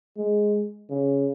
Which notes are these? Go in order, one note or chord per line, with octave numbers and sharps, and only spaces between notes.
G#3
C#3